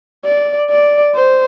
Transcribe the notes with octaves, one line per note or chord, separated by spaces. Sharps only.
D5
D5
C5